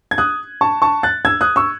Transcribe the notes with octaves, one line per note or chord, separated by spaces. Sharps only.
G#6
D#6 F#6
A5 C#6
A5 C#6
F#6 A6
E6 G#6
D#6 F#6
C#6 E6